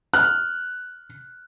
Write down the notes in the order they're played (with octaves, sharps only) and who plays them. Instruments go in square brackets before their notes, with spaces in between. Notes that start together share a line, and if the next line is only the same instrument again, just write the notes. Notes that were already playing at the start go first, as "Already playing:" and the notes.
[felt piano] F6 F#6